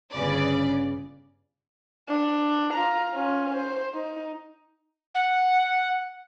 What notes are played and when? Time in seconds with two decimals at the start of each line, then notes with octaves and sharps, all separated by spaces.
0.12 G1 C#3 B4 D5
2.08 D4
2.73 F4 A#5
3.14 C#4 F4
3.55 C5
3.94 D#4
5.14 F#5